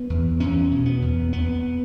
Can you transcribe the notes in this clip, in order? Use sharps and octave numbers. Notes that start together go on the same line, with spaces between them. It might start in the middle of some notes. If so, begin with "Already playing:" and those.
Already playing: B3
E2
E2 C#4
B2
B3
E2
E2 B3